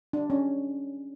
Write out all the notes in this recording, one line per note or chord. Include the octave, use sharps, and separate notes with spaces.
D4
C#4